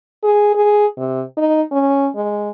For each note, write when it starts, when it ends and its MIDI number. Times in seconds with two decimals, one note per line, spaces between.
0.23 0.50 68
0.55 0.87 68
0.97 1.22 48
1.37 1.62 63
1.71 2.08 61
2.15 2.50 56